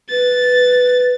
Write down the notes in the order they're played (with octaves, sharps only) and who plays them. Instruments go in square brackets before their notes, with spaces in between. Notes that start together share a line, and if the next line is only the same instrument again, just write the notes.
[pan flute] B4 [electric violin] A6